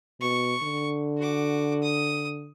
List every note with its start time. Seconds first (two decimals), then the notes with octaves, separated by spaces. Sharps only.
0.21 B2 C#6
0.63 D3
1.18 F#4 D6
1.83 D#6